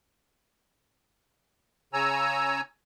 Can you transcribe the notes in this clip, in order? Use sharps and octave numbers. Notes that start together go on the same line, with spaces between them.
C#3 C#5 G#5 A#5 E6